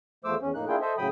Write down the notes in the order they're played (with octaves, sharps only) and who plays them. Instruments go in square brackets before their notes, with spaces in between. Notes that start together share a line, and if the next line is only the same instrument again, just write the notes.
[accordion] E2 F3 A3 C5 D6 E6
E2 C#4
F2 A2 A#3 D#4 F#6
A#3 D4 E4 F4 G#4 G5
A4 C5 D#5 E5
A2 C#3 F#3 G5 B5 D#6